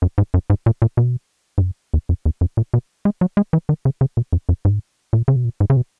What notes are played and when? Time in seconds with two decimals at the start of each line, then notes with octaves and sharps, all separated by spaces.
0.02 F#2
0.18 G#2
0.34 F#2
0.50 G#2
0.66 A#2
0.82 A#2
0.97 B2
1.58 G#2
1.62 F#2
1.94 E2
2.09 F#2
2.25 E2
2.41 F#2
2.57 A#2
2.74 B2
3.05 G#3
3.21 F#3
3.37 G#3
3.53 E3
3.69 D#3
3.85 C#3
4.01 C#3
4.17 B2
4.33 F#2
4.49 F#2
4.65 G#2
5.13 A#2
5.28 C#3
5.36 B2
5.45 A#2
5.60 G#2
5.70 C#3
5.77 B2